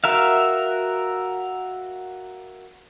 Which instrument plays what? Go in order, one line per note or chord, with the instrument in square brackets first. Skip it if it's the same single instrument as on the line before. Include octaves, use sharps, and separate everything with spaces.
[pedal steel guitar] F#4 A#4 E5 F5